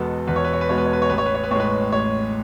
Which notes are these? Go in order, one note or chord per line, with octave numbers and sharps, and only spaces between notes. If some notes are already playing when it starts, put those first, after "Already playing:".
Already playing: E2 B2 G#3 B3 A4
E2 B4
C#5
B4
C#5
B4
B2 G#3 B3 C#5
B4
C#5
B4
C#5
A1 B4
C#5
B4
C#5
B4
A2 C#5
G#3 B4
A1 C#5